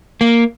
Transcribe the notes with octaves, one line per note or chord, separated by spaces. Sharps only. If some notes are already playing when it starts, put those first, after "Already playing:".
A#3